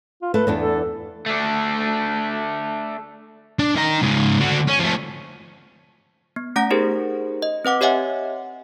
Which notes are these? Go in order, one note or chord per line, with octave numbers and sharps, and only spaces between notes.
F4
A3 A4 B4
E2 B3 D4
A4
A3 D4
D4
D#3 A#5
G#2 C#3
D3 F#4
C#4
F3 A3
B3
A3 C#4 F#5 A#5 A#6
D#4 G4 G#4 A#4 C5
D#5
C4 B4 F#5 D6
G4 C#5 D#5 E5 F#5 G#5